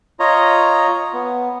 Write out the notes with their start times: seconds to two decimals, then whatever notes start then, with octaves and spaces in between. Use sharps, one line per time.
0.20 F4 C#5 D#5 A#5
1.13 B3